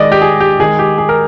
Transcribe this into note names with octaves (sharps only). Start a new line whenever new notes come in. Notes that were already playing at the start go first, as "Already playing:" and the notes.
Already playing: D#3 G#3 D5 D#5
G4
G#4
G4
D#3 G#3 G#4
G4
G#4
A#4